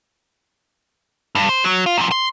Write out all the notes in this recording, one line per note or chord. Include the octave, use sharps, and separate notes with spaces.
G2
C5
F#3
F4
F#2 F3
C6